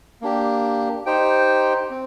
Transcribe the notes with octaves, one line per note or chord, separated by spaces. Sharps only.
A#3 D4 G4
D#4 G4 C5 G5
C4